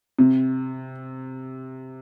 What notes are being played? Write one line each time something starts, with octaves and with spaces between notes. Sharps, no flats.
C3